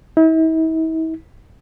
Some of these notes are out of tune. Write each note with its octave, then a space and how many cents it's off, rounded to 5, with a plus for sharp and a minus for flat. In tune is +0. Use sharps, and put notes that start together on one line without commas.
E4 -45